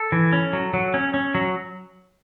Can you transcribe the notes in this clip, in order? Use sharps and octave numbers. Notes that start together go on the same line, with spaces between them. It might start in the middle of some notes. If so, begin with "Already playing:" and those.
Already playing: A4
E3
C#4
F#3
F#3
C#4
C#4
F#3